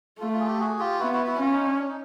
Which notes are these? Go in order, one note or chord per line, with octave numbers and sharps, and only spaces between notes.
A3 F4
F4
G#4
G4 A4
F#4 G#4
F4 G4
B3 E4 F#4
E4 F#4
E4 F#4
C#4 F4
D#4
D4
D4
D#4